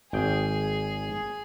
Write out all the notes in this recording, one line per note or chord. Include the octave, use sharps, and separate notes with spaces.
G#1 G#4 G5